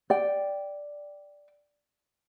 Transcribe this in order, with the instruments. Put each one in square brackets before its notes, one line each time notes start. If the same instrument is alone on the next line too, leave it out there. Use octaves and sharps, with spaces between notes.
[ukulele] D5 G5